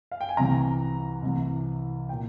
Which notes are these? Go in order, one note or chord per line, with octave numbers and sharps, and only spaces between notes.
F5
G5
G#5
C2 C3 E3 A#5
C2 C3 E3
A#2 G5